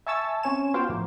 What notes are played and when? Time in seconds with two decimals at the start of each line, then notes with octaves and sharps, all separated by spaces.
0.06 E5 G#5 A5 C#6 E6 A6
0.43 C4 C#4 C#5 G#5 E7
0.74 B3 F4 F#4 C5 F5 G5
0.89 A2 F3 A#3